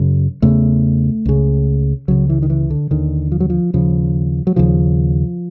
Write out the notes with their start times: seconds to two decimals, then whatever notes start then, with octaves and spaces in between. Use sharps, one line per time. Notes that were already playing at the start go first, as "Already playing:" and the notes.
Already playing: F#2 C#3
0.42 E2 C#3 A3
1.25 C#2 C#3
2.08 C#2 C#3 F#3
2.29 E3
2.43 D#3
2.50 E3
2.70 D3
2.91 D#2 D3 D#3
3.32 F3
3.40 F#3
3.50 F3
3.74 D#2 C#3 F3
4.47 F#3
4.56 D#2 C#3 F3